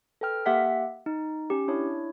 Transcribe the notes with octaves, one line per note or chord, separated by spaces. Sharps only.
A4 B4 G5 F6
A#3 G4 E5 F#5 B6
D#4
C#4 G4
D4 E4 C#5